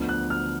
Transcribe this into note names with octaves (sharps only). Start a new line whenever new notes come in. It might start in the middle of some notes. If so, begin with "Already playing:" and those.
Already playing: D2 D3 F3 B3
F#6
F6